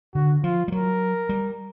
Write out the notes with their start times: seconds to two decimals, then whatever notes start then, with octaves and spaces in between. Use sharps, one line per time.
0.15 D3 F#4
0.44 F3 F4
0.68 G3
0.72 F#3 A#4
1.29 G3